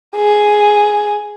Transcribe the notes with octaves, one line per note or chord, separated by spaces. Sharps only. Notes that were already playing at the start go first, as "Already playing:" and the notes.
G#4